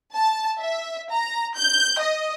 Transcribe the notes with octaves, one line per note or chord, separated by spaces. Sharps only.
A5
E5
A#5
G6
D#5